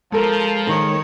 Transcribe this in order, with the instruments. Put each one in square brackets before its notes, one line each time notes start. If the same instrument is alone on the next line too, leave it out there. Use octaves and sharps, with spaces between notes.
[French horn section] F3 [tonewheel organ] G#3 [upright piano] A4 A#4
[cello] D#3 C#5